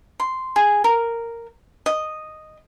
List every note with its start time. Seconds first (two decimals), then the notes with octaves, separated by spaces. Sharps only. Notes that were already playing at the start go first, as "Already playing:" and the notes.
0.20 C6
0.56 G#4
0.84 A#4
1.86 D#5